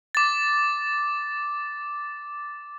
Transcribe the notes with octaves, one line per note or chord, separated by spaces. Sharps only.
D6 A6